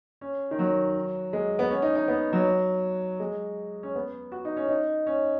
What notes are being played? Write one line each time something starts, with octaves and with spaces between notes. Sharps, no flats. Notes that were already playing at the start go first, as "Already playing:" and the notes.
C#4
D#3
F#3
G#3
B3
C#4
D#4
D#4
B3
F#3
G#3
C#4
B3
F#4
D#4
C#4
D#4
C#4